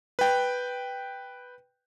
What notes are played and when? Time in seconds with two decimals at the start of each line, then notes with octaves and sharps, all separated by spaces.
0.19 B4 G5